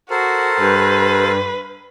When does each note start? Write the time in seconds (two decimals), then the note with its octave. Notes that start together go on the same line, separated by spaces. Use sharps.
0.10 F#4 A4 A#4 C5
0.60 G2 B4